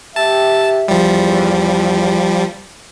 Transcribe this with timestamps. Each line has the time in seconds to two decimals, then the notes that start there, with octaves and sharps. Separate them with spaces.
0.16 G4 E5 A5
0.88 E2 F3 G3